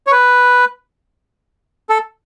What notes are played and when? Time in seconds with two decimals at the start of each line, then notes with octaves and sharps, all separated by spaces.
0.07 C#5
0.12 B4
1.89 A4